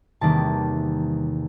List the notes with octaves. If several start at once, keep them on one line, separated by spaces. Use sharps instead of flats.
E2 C3 D#3 G3 A#3 A5